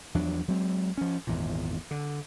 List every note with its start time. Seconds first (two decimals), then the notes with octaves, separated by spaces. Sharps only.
0.14 E2 F3 F#3 D4
0.48 F#3 G#3 C4
0.97 F3 C#4
1.27 G#1 E2 A#2
1.91 D3